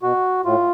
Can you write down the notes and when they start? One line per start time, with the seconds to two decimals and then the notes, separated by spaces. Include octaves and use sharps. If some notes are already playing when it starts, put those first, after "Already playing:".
0.02 B2 F#4
0.45 A2 F4